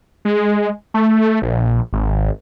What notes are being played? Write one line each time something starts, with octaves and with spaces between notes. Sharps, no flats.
G#3
A3
A#1
G#1